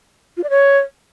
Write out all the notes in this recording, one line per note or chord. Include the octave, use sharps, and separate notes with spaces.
F4
D5
C#5